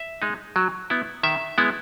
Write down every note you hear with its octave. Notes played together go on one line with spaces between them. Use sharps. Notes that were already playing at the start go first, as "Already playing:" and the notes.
Already playing: E5
G#3 D#4
F#3
B3 E4
D#3 E5
G#3 B3 E4